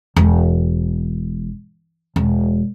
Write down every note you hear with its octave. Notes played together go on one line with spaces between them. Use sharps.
E1
E1